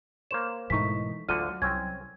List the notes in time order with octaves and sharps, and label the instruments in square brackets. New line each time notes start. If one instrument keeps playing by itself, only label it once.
[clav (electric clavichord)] A#3 C5 C#5 [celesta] E7
[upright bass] G#2 B2 [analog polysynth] E3 A3 D#4 [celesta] C#6 B6
[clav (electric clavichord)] D2 D3 F#5 [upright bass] F#3 [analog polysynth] F4 [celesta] F6 D#7
[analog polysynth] C2 [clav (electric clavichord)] C4 C#4 [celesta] G#6